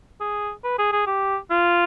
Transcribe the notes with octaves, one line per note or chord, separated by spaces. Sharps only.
G#4
B4
G#4
G#4
G4
F4